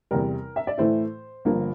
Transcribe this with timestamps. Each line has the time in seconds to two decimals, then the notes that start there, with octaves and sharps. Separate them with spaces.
0.11 E2 C3 G3 A#4
0.56 E5
0.67 D5
0.77 A2 E3 A3 E4 C5
1.45 G1 G2 F3 A#3